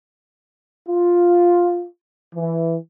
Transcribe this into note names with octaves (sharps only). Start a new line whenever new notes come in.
F4
E3